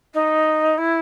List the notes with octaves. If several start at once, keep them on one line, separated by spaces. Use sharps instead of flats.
D#4
E4